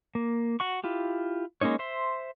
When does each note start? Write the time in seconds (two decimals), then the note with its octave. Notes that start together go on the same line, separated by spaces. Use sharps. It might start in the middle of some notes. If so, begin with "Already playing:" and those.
0.15 A#3
0.60 F#4 F#5 C#6
0.84 E4 F4 G4
1.61 G#3 A#3 C#4 D#4 C#5
1.79 C5 E5 C6